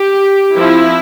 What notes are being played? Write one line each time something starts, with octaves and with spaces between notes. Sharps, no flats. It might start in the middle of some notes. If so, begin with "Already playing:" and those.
Already playing: G4
F3 C4 E4